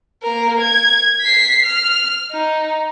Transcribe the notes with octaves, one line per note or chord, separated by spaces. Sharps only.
A#3 A#4
G#6
B6 C7
F6
D#4